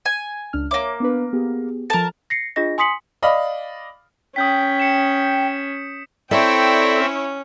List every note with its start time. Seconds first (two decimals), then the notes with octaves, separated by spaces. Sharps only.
0.05 G#5
0.53 C#2 D4 F6
0.71 A#3 C#5 E5 D6
1.00 B3 D4 B4
1.33 B3 G4 G#4
1.90 F3 A4 A#4 A5
2.30 A#6 C7 C#7
2.56 D4 F4 G#4 D#5 A#6
2.78 G#5 C6 D#6 B6 C#7 F#7
3.22 D5 D#5 F5 B5
4.36 C#4 G5 D#6 G6 B6
4.80 C#7 E7
6.31 C4 E4 A4 C#5 D5 E5 G5
6.96 C#4